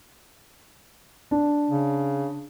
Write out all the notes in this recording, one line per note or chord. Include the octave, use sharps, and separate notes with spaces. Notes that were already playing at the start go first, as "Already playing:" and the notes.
D4
C#3